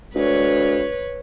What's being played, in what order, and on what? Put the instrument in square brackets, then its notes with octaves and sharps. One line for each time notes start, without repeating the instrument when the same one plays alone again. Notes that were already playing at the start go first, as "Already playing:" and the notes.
[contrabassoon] D2 [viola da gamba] B4 C#5